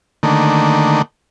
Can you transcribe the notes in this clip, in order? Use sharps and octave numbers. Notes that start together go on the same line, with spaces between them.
D3 D#3 A3 A#3